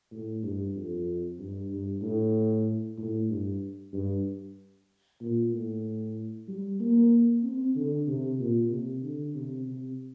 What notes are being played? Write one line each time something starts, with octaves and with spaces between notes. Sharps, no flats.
A2
G2
F2
G2
G2
A2
A2
G2
G2
A#2
A2
G3
A#3
C4
D3
C3
A#2
C3
D3
C3
C3